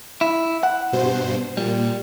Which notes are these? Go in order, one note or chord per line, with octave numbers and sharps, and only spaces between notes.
E4
F#5
G2 B2 C5
A#2 G3